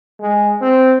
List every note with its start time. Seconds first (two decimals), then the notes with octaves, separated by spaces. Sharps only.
0.20 G#3
0.61 C4